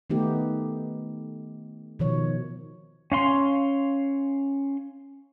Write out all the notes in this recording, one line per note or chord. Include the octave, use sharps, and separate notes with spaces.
D#3 A3 B3 D#4 G4
B2 D#3 F3 C#5
C#4 F5 C6